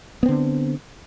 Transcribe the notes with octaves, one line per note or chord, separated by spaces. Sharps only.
D3 B3 C4